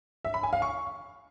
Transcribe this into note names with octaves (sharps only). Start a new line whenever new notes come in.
E5
B5
G#5
F5
C#6